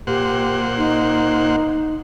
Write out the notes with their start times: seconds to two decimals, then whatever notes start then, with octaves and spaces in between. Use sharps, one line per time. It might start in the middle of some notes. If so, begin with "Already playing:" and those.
0.07 A#2 G4 C5 F#5
0.77 D#4